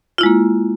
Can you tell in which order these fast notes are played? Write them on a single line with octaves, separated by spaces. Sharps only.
F4 E4 G#3 A#3